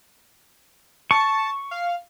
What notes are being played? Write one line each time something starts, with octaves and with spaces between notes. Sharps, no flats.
A5 C#6
F5